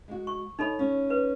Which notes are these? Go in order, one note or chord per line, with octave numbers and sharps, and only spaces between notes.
G#3 F#4
C#6
D#4 A4 C#5 D#5 B5
C#4
B4